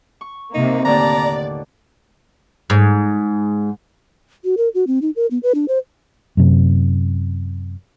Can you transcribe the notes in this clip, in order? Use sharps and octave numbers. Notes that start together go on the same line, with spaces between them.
C#6
C3 A#3 D#4
D#2 A2 D3 D5 A#5
G#2
F#4
A#4
F#4
C4
D#4
A#4
B3
B4
D4
C5
F#2 C3